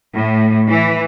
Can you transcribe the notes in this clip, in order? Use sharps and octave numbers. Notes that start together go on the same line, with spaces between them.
A2
E3